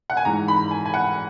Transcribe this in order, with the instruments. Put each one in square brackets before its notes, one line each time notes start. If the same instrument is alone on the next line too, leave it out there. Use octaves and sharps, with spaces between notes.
[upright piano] F#5
G#5
G#2 E3 A#5
B5
G#5
G#5
F#5